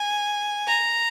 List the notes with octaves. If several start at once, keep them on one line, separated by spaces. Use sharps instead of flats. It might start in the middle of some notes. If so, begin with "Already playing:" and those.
Already playing: G#5
A#5